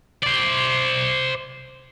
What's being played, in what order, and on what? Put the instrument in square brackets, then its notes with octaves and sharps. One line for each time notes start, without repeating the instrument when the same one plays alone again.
[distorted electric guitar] C5 D5